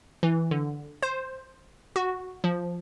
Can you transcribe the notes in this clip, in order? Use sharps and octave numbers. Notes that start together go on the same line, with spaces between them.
E3
D3
C5
F#4
F3